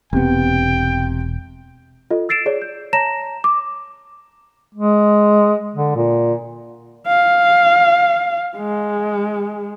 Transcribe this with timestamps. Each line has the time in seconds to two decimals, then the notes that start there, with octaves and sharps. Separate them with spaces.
0.13 E1 C3 B3 G5
2.11 F4 A4 D#5
2.29 E6 A6 C7 D7 E7
2.46 G#4 C#5 D5
2.62 G6
2.93 C#5 A5 A#5 A#6 E7
3.44 D6
4.75 G#3
5.75 D3
5.96 A#2
7.07 F5
8.57 G#3